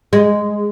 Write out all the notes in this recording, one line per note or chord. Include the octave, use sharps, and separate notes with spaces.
G#3